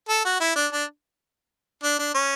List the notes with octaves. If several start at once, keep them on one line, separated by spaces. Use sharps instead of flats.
A4
F#4
E4
D4
D4
D4
D4
C#4